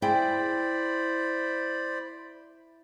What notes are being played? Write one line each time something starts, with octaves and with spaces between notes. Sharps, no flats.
E4 G#4 C5 D5 G5 B5